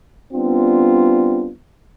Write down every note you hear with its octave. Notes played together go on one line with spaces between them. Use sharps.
G3 B3 C4 D4 F4